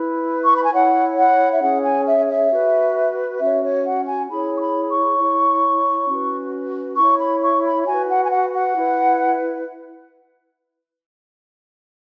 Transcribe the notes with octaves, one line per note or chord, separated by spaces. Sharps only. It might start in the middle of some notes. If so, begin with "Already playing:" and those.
Already playing: E4 B4
C#6
B5
G#5
E4 C#5 F#5
F#5
E5
C#4 G#4 C#5 F#5
G#5
E5
E5
F#4 B4
C#4 F#4 C#5 E5
C#5
F#5
G#5
E4 G#4 C#5 B5
C#6
B5
C#6
E4 C#5
C#4 F#4 B4
E4 C#5 C#6
B5
C#6
B5
F#4 B4 G#5
F#5
G#5
F#5
F#5
E4 B4